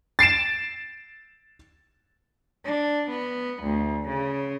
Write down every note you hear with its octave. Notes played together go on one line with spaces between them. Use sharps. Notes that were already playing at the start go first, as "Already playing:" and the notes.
A6 C7 D7 E7
D4
B3
D2
C#3